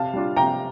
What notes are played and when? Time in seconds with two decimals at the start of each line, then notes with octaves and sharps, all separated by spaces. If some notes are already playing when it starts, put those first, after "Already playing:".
Already playing: C3 F5 A5
0.14 G3 D4 F4
0.36 C3 G5 A#5